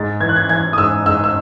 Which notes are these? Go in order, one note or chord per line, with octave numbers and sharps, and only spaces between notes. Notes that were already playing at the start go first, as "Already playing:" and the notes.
Already playing: G#2 A6
E3 G#6
F#6
G#6
E3 G#6
D#6
G#2 E6
G#2 E6
E6